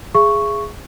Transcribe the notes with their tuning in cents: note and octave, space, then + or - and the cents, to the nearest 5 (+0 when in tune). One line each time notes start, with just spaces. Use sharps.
G#4 +0 E5 +45 C#6 +0